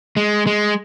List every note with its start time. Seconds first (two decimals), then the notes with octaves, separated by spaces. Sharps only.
0.17 G#3
0.47 G#3